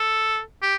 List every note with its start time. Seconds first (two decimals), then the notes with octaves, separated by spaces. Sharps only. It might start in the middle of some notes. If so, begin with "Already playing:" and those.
Already playing: A4
0.62 G4